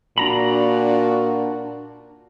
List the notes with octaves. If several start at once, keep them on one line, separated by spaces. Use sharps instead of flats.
A#2 D4 F#4 A#5 B5